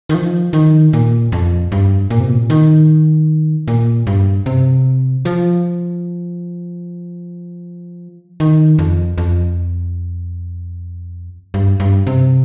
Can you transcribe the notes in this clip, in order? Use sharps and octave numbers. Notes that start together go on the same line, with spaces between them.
D#3
F3
D#3
A#2
F2
G2
A#2
C3
A#2
D#3
A#2
G2
C3
F3
D#3
F2
F2
G2
G2
C3